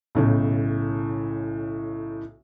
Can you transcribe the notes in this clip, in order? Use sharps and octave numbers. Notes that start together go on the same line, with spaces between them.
B1 A2 C#3